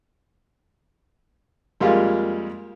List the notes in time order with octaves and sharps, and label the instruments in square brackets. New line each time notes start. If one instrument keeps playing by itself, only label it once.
[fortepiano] F2 G3 G#3 A#3 F4